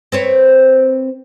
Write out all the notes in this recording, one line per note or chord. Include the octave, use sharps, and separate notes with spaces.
C4 B4 C#5